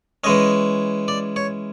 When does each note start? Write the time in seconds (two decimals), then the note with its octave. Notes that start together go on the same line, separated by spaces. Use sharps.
0.24 E3 G#3 C#4 D#5
1.08 D5
1.36 C#5